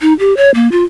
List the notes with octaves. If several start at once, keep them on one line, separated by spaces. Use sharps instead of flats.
D#4
G4
C#5
A#3
F4